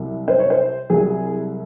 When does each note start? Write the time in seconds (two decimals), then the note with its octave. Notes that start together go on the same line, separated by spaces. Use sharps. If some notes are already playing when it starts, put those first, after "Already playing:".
Already playing: C2 C3 F#3
0.28 C5
0.39 C#5
0.50 C5
0.90 C2 C3 F#3 G#4